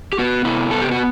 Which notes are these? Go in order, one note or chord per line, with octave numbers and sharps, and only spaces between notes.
G4
B3 F#4
C3 E4
B3 A4
G4
F#4